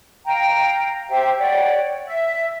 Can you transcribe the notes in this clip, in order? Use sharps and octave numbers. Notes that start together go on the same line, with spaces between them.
F5 G5 A#5
G4 C5 E5 G5
C#5 D5 F#5 G5
E5